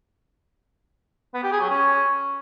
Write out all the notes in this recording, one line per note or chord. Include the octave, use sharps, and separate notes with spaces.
B3
G4
G#4
F#3
C#4